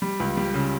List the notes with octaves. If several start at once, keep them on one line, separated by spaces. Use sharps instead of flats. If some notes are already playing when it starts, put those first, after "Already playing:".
G3
C#2
G3
C#3